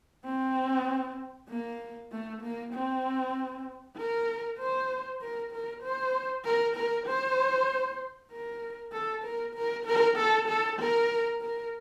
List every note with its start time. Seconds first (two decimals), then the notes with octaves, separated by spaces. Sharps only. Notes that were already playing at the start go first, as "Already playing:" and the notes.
0.25 C4
1.49 A#3
2.11 A3
2.42 A#3
2.73 C4
3.97 A#4
4.59 C5
5.21 A#4
5.52 A#4
5.83 C5
6.45 A#4
6.76 A#4
7.06 C5
8.31 A#4
8.92 A4
9.24 A#4
9.55 A#4
9.86 A#4
10.17 A4
10.48 A4
10.79 A#4
11.41 A#4